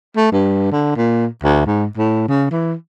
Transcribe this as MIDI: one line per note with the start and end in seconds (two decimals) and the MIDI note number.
0.16 0.31 57
0.32 0.67 43
0.71 0.94 50
0.96 1.26 46
1.43 1.63 38
1.66 1.86 44
1.97 2.27 45
2.28 2.46 49
2.50 2.74 52